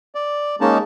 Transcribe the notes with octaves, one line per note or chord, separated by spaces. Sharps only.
D5
G#3 A#3 C#4 D#4 A5